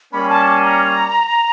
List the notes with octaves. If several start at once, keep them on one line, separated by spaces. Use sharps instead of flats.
G3 A#3 C#4 B5
A5
A5
A#5